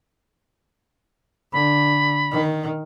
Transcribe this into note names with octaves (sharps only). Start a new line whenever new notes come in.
D3 B5
D#3